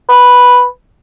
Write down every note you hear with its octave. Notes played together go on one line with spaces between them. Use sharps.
B4